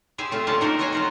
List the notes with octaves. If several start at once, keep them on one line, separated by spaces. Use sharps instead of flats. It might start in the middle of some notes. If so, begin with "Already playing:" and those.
G4 G#4 C5 E5 G#5
A3 C4 F4
D3 A#3 C#4 F4 D5 A5
A#3 D#4 F#4 A#4 C5
F#4 C5 C#5 D#5 F5 G#5
F#3 F4 F#4